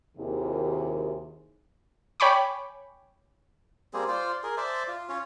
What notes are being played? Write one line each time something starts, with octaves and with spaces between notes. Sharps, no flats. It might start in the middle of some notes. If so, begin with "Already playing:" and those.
D#2 C3 D#3 E4 F#4 G#4
C#5 G5 G#5 B5 C#6 D6
G3 A#3 C4 G#4
F4 C5 D5
G#4 A#4
C5 D5 E5 A5
F4
C#4 F4 C#5